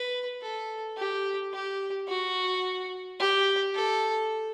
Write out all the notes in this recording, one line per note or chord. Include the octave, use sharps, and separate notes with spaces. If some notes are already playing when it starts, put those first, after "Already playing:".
Already playing: B4
A4
G4
G4
F#4
G4
A4